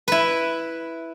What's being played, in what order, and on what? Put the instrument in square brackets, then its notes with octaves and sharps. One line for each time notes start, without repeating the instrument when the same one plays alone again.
[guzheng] E4 B4